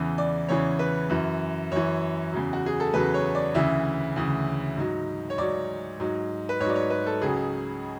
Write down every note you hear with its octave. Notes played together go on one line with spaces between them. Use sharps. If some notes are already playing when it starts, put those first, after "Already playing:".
Already playing: E2 C#3 E3
D5
E2 C#3 E3 C#5
B4
F#2 E3
F#2 E3 C#5
E2 C#3 F#3
F#4
G#4
A4
E2 C#3 F#3 B4
C#5
D5
D2 C#3 E3 E5
D2 C#3 E3
G#2 F#3
C#5
G#2 F#3 D5
G#2 F#3
B4
G#2 F#3 C#5 D5
C#5
B4
A4
C#2 C#3 F#3 G#4